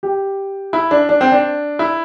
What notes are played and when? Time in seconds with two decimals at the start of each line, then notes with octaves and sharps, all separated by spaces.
0.03 G4
0.73 E4
0.91 D4
1.09 D4
1.21 C4
1.32 D4
1.79 E4